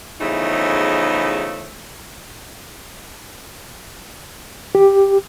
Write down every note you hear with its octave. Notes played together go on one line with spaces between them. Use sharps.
E2 C#3 E3 F3 A3 D#4
G4